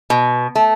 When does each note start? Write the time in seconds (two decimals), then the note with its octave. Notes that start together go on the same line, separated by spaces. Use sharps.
0.10 B2
0.55 A3